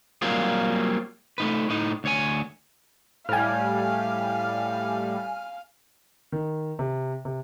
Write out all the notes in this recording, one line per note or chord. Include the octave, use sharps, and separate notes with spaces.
F#3 G3 A#3 C4 F4 G#4
A3 D#4 B4
A2 D#4
D2 C#5 G#5
A2 G3 F5 G#5 F6
D#3
C3
C3